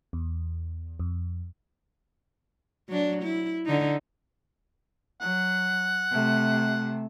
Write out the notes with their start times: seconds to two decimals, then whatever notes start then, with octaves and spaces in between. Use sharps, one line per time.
0.13 E2
1.00 F2
2.89 F#3 D4
3.23 E4
3.66 D3 D#4
5.21 F#3 F#5
6.11 C3 A3